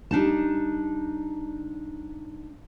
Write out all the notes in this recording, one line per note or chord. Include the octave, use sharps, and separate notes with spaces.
G3 D4 D#4 A5